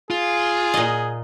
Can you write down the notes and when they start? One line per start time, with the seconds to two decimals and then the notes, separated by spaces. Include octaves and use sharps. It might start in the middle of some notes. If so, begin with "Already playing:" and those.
0.10 F4 G#4
0.74 A#2 D#5